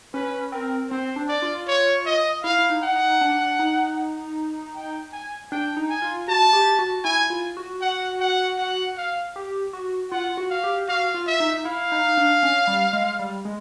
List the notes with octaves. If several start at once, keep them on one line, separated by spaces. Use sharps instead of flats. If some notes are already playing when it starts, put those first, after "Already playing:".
C#4 B4
C4 A#4
C4 C5
D4
D5
F4
C#5
D#5
E4 F5
E4
D#4
F#5
D#4
D4
D#4
G5
G#5
D4 G5
D#4
G#5
F4
F#4 A5
G4
F#4
E4 G#5
F4
F#4
F#5
F#5
F#5
F5
G4
F#4
F4 F#5
F#4
F5
G4
F#4 F5
F4
E5
D#4
E4 F5
D#4
D4
C#4
G3
G#3
G3
G#3